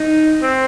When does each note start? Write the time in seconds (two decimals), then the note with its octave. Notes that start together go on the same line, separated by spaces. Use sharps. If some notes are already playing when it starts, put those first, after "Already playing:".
Already playing: D#4
0.42 C4